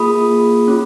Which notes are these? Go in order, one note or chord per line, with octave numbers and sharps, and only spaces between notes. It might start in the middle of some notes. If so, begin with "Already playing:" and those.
Already playing: A#3 F4 G#4 B5 D#6
C#4 F4